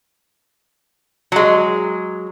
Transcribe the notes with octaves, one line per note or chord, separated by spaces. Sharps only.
F#3 G#3